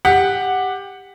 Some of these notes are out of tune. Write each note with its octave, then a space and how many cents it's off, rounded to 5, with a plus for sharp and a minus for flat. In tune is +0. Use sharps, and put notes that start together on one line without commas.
G4 +15 F#5 +0